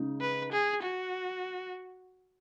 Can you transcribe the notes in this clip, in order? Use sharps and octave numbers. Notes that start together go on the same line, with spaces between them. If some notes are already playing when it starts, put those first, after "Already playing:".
Already playing: C#3 G#3 D#4
B4
G#4
F#4